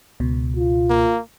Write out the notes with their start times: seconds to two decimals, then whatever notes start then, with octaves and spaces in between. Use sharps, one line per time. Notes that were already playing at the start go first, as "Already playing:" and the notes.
0.20 C#2 B2
0.56 F4
0.90 A#3